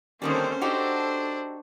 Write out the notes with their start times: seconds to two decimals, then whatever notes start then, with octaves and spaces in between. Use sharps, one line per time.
0.22 D3 D#3 G3 A#3 C4 C#4 A4 C5
0.61 D4 D#4 F#4 G4 A4 C5